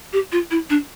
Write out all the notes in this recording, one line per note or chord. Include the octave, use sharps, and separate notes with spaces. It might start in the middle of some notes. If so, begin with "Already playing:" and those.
G4
F4
E4
D4